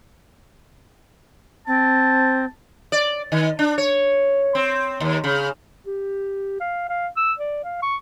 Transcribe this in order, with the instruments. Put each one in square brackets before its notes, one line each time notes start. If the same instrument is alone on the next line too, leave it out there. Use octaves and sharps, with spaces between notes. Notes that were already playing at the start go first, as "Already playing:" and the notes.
[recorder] C4 [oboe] A5
[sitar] D5
D#3
D4
C#5
C4
D#2
C#3
[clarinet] G4
F5
F5
E6
D5
F5
C#6